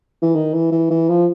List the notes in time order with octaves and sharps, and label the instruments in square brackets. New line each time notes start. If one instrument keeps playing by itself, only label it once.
[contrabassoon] E3
D#3
E3
E3
E3
F3